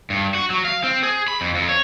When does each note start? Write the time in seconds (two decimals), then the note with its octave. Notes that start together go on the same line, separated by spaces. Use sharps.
0.10 G2
0.34 F#4
0.50 F#3
0.65 F5
0.84 C4
1.03 G#4
1.28 B5
1.41 F2
1.55 F2
1.69 C#5